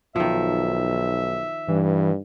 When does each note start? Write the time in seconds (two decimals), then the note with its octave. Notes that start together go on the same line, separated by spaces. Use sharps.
0.16 B1 D#3 F3 E5
1.68 G2 E3